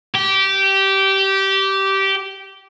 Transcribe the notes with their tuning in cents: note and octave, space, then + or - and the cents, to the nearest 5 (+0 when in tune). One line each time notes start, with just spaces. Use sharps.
G4 -15